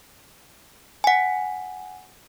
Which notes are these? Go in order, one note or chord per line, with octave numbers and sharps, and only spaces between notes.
F#5 G#5